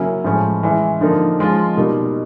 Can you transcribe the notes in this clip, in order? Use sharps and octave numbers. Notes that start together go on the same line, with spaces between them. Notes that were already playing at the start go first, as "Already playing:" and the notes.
Already playing: C#3 F#3 A#3 C#4 E4
A2 F3 G#3 C#4
E3 G#3 C#4 E4
D3 F3 A#3 D#4
F3 G#3 C#4 F4
B2 G3 A#3 D#4